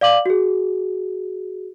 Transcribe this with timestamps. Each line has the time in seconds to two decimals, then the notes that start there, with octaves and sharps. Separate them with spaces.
0.01 D5 F5 D6 F#7
0.26 F#4 G#4